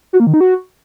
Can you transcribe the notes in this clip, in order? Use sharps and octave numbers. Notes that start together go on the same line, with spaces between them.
F#4
A#3
D#3
D#4
F#4